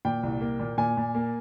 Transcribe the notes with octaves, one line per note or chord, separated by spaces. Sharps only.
A#2 G5
C2
A#3
A#2
A#2 G#5
A#2
A#3